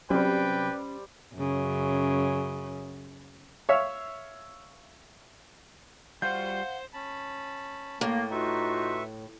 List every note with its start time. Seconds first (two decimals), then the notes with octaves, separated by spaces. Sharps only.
0.10 C3 F#3 G3 C#4 B4 C5 D5 G5
1.36 F#2 C#3
3.69 C#5 E5 F5
6.22 G3 F4 F#4 C5 F5 F#5 G6
6.93 C#4 A5 B5
8.01 A2 A#3
8.31 D#4 F4 F#4 B4 E5 C#6